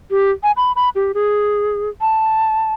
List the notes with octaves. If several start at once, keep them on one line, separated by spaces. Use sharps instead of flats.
G4
G#5
B5
B5
G4
G#4
A5